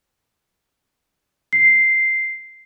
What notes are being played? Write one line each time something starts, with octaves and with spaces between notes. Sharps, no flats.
C7